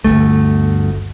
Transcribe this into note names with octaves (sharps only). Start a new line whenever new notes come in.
G1 D2 A3